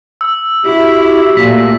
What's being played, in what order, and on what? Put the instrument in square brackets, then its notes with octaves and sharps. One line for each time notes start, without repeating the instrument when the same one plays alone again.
[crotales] E6
[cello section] E4 [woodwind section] F#4 G4
[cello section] A#2 A3 [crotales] B6